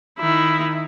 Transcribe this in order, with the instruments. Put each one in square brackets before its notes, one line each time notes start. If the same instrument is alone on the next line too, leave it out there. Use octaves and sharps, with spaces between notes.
[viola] D#3 E4